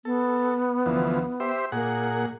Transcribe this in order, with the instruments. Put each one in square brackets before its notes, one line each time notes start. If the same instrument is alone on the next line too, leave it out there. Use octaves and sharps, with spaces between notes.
[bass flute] B3 [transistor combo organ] A4
[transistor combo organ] D2 E3 F3
G4 C5 E5
[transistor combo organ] A#2 G#4 F#5 [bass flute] A#3